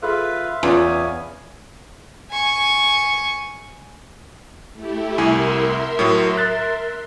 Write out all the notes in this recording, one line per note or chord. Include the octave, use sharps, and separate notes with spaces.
F4 G#4 A4 B4 E5 F5
E2 B3 C#4 F4 C#5 G#5
G#5 C#6
A3 E4 G4
C2 E4 A#4 E5 G#5 C6
A2 F#3
F#6 A6